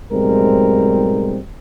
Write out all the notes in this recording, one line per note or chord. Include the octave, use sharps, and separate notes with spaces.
B1 G#2 G3 G#3 C4 A#4